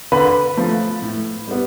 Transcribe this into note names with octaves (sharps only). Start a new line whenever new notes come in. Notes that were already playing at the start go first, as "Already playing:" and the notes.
D3 B4 B5
F3 A3
A2
G3 B3